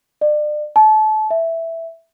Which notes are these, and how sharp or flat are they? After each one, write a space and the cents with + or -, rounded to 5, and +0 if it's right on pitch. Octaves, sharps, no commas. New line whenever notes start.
D5 +35
A5 -30
E5 +0